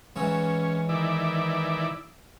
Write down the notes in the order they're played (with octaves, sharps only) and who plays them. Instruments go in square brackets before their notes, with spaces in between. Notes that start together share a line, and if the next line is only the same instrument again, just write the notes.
[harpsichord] G#2 E3 [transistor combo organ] C#4
[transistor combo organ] D#3 E4 D5